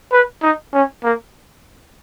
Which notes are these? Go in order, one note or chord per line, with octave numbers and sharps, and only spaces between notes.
B4
D#4
C#4
A#3